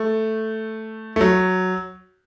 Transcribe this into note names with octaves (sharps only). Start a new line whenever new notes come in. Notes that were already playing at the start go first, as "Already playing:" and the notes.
Already playing: A3
A3
F#3